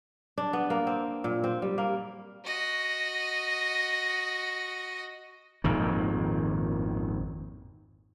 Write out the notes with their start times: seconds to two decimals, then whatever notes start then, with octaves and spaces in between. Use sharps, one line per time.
0.38 D4
0.53 B3
0.70 A#3
0.87 C4
1.24 A#2
1.44 C4
1.62 G3
1.78 A#3
2.45 F#4 D#5
5.64 G#1 F2 A#2 D#3